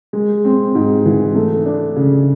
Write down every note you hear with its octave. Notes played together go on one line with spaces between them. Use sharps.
G#3
C4
G#2
E3
A3
D4
C#3